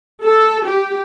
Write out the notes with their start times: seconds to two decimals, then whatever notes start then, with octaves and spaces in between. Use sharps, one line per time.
0.23 A4
0.65 G4